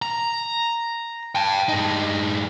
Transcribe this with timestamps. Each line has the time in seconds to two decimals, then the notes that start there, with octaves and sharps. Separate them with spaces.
0.02 A#5
1.35 G5 A5
1.69 G2 D#4